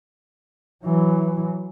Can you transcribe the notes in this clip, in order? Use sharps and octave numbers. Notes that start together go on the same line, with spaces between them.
E3 F#3